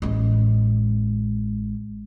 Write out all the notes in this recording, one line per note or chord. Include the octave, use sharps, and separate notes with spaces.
A1 G#3